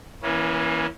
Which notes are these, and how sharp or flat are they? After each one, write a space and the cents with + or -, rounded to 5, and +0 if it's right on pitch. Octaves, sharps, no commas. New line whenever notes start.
E3 +0 A#3 +35 C#4 +0